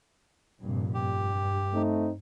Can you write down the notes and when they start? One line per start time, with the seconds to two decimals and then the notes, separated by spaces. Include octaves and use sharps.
0.60 F1 G2 A#2
0.94 G2 G4
1.73 A3 C4 D#4